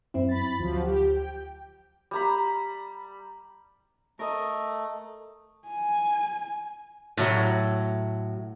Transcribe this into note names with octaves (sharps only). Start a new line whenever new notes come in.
F#2 C4 E4
B5 A6
D2 F3 F#3
G4
G5
G3 A#5 B5
A3 A#4 D#5
G#5
A2 F#3